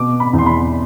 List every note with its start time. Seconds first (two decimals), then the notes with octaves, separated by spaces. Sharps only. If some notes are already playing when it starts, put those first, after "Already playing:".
Already playing: B2 D6
0.20 B5
0.33 E2
0.38 C6
0.46 B5